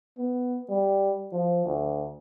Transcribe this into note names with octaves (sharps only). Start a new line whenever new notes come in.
B3
G3
F3
D2